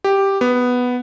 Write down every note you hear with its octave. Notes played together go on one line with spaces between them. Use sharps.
G4
B3